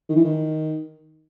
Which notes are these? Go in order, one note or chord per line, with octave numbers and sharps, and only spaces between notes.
D#3
E3
D#3